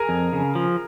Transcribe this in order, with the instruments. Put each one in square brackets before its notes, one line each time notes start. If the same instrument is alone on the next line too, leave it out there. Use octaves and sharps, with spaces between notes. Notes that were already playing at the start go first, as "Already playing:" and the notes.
Already playing: [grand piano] G#4 A#4 G#5 A#5
[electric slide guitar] F2
C#3
F3